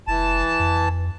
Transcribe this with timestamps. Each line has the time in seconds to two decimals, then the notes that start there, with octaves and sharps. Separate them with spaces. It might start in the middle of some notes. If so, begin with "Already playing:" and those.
0.08 F1 E3 A5
0.60 F2